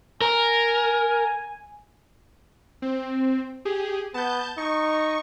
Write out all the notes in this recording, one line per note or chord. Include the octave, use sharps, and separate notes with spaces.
A#4 G#5
C4
G4 G#4
B3 A5 G6
D#4 C#6